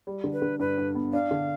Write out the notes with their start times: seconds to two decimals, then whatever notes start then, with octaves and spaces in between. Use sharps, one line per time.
0.07 G3
0.24 D3
0.33 B4
0.42 D3
0.59 G2 B4
0.78 G2
0.95 B3
1.13 D4 F5
1.31 D3